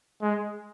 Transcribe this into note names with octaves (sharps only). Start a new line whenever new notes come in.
G#3